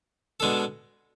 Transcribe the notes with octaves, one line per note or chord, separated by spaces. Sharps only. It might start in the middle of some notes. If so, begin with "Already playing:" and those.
B2 G#3 D4 A4